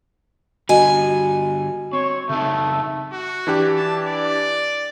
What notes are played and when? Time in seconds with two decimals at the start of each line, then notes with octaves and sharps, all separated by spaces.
0.69 D3 G3 F#4 D#5 G#5
1.93 C4 C#5
2.29 C#3 A3 C4 D#4
3.12 F#4
3.47 E3 D4 G4
3.76 A5
4.08 D5